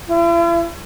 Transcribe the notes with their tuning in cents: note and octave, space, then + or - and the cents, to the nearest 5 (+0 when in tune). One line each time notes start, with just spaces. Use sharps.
E4 +45